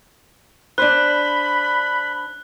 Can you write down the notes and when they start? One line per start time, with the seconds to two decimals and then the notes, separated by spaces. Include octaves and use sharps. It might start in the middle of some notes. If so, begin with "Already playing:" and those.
0.78 D4 C5 B5 F#6